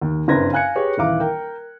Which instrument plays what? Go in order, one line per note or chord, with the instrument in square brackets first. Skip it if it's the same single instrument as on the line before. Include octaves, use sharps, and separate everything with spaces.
[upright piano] D#2
F#1 G2 C4 B4 G#6 A#6
F5 G#5 F#6 G#6 C#7
G4 G#4 B4 C#5
D#1 E3 F5 D6
A#4 G5